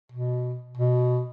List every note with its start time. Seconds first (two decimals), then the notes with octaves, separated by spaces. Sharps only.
0.12 B2
0.77 B2